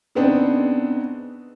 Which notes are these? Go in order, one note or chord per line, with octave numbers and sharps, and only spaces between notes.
C#3 B3 C4 D4 D#4